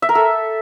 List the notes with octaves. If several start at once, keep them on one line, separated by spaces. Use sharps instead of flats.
E5
A#4
A4